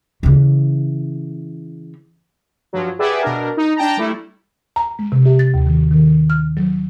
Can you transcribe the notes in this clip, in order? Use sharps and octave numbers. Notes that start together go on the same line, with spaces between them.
C#3 E3
G2 F3 F#3
G4 G#4 B4 D5 E5 F#5
B2 D4 A#4
D#4
D4 G5 A5 A#5
G3 A3 E4
A#5
G#3
C3
G4
A6
D#2
D#3
D#3
F6
F#3